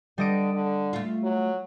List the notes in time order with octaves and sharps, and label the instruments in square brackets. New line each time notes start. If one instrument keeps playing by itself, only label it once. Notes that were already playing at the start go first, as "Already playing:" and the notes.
[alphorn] D3 [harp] G3 D#5 D7
[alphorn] D3
[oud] A3 F4
[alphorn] F#3